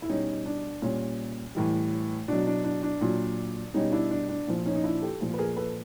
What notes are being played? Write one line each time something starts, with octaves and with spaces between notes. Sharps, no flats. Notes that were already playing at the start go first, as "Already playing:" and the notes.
E4
B2 G3 C#4 D#4
D4
A#2 G3 C#4
A2 E3 G3
B2 F#3 D4
D4
D4
D4
A#2 F#3
B2 G3 C#4 D#4
D4 E4
D4
D4
A#2 F3
C#4 D#4
D#4
D4 E4
G4 A4
A#2 F3
B4
G#4 A#4
A4 B4